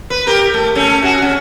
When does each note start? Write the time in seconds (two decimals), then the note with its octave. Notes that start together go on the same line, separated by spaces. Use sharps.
0.10 B4
0.27 G4 A#4
0.54 A3
0.75 A3 C#4
1.02 F#4 G#4
1.22 C#4